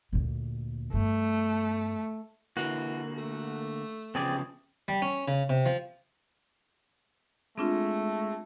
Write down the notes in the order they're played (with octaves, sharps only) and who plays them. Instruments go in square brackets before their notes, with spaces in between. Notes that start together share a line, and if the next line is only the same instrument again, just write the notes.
[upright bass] D2 A#2
[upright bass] G2 B3 [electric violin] A3
[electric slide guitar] D3 A#3 [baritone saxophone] E3 [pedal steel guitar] F#4
[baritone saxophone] A3
[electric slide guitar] C#3 F3 B3 [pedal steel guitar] C4 G#4 D5
[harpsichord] G3
C#4
C#3
C3
F3
[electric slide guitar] G#3 [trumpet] A3 [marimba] C4 D4 F4